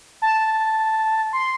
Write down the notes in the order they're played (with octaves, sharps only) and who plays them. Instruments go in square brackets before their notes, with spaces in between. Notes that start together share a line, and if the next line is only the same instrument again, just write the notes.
[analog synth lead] A5
C6